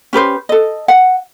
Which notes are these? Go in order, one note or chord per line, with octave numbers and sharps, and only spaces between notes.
C#4 G4 B4 C5
A4 D#5
F#5